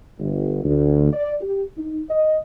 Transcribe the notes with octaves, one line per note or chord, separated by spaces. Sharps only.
G1
D2
D5
G4
D#4
D#5